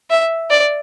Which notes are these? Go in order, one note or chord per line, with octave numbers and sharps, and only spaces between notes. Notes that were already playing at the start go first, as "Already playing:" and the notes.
E5
D5